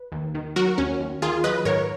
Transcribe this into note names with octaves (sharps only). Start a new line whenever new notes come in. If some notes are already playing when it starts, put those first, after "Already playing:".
Already playing: B4
D#2
D#3
F#3 F#4 A#4
D#2 C#4
D#2
D#3 F4 G#4
F#3 B4 D#5
G#2 A#4 C#5